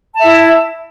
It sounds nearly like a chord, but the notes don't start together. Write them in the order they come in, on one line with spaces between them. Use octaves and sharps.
A5 E5 E4